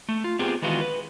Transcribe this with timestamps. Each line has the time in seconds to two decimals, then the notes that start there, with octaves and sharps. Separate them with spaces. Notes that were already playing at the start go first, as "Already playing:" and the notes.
0.09 A3
0.24 F4
0.39 B3 C4 F4 G4 G#4
0.62 D#3 E3 G#3 B3 F4 F#4
0.81 B4